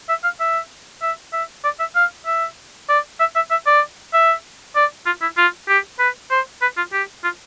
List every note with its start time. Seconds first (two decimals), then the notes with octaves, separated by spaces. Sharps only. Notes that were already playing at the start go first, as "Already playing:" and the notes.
0.09 E5
0.24 F5
0.40 E5
1.02 E5
1.33 E5
1.64 D5
1.79 E5
1.95 F5
2.26 E5
2.89 D5
3.20 E5
3.36 E5
3.51 E5
3.66 D5
4.13 E5
4.76 D5
5.06 F4
5.22 E4
5.37 F4
5.68 G4
5.99 B4
6.31 C5
6.62 B4
6.77 F4
6.93 G4
7.24 F4